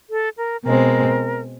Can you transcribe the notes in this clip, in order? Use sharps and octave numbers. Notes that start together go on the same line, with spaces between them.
A4
A#4
B2 G#3 C4 A#4